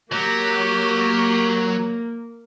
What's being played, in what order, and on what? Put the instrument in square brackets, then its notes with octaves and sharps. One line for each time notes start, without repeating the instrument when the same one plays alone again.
[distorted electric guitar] F#3 [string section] A#3 [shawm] G4